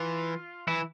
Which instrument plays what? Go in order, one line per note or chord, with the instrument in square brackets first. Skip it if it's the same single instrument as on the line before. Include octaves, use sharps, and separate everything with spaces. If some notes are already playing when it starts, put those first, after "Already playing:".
Already playing: [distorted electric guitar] E3 [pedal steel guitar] F4
[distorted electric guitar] E3 [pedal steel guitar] E4